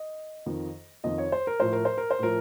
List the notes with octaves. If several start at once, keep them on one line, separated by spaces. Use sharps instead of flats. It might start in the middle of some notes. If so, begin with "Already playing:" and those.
Already playing: D#5
F2 D#3
F2 D#3 D#5
C#5
C5
A#4
A2 F3 C5
A#4
C5
A#4
C5
A2 F3 A#4